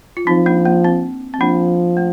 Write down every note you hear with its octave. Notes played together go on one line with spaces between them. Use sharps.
F4
F3 C4 D#4
A#3 D4
A#3
C4
C4
F3 A#3 D4
A3